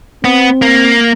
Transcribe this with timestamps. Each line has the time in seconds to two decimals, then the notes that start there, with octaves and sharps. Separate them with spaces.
0.24 B3 C4
0.62 A#3